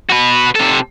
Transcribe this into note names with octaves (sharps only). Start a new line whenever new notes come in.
F#4 B4
C3 A4